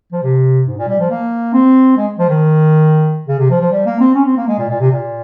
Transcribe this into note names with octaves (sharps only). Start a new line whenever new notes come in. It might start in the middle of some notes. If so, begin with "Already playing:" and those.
F3
C3
G#2
A#2
G3
F3
A#3
C4
G#3
F3
D#3
C#3
C3
F3
F3
G3
A#3
C4
C#4
C4
A#3
G#3
A#2
A#2
C3
A#2